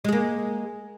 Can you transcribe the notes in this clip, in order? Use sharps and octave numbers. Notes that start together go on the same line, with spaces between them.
G#3 A#3 G#4